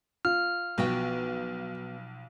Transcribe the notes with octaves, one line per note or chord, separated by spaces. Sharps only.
F4 F6
B1 F3 B3 F#4 G5